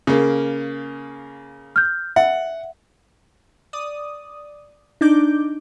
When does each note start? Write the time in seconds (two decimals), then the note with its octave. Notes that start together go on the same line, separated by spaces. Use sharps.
0.07 C#3 A#3
1.76 F6 G6
2.16 E5 F#5
3.73 D5 D#6
5.01 D4 D#4 D6 G6